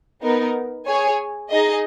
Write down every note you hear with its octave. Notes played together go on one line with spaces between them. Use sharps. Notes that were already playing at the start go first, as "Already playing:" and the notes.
B3 D#4 A#4
G#4 C#5 G#5
D#4 G#4 D#5